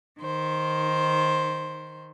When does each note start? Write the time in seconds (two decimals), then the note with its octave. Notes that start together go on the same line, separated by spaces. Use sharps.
0.21 D#3 C5